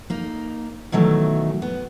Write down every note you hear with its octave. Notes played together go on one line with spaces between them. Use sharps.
A#3 D#4
B2 D#3 E3 F#3 A3
B3